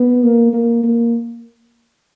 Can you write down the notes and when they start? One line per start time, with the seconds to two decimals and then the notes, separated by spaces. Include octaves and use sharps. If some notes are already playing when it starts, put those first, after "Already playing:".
Already playing: B3
0.23 A#3
0.53 A#3
0.83 A#3